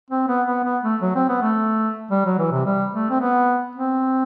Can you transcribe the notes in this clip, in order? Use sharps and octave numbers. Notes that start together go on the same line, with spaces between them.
C4
B3
B3
B3
A3
F#3
C4
B3
A3
G3
F#3
E3
C3
G3
A3
C4
B3
C4